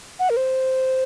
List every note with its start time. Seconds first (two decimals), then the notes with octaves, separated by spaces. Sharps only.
0.19 F#5
0.30 A#4
0.37 C5